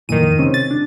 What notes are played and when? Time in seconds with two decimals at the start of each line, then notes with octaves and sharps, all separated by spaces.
0.09 F2 A#2 D#3 E3 D#7
0.38 C3 C4 C#4
0.54 A6
0.71 D4